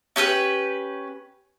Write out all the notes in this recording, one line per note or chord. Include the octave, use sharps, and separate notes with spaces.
C#4 G4 A4 B4